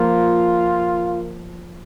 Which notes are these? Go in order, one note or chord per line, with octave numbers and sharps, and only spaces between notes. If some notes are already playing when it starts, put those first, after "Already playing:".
Already playing: F3 A#3 F4